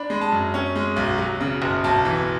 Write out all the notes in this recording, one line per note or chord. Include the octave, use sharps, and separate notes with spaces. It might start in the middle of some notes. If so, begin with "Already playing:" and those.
Already playing: D4 B5
G#3
A5
F#2
C#4
G#3
B1
F#3
C#3
F#1
B1 A5
E3